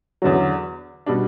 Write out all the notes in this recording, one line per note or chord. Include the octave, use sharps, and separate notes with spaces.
E2 D3 F#3
B2 G3 D4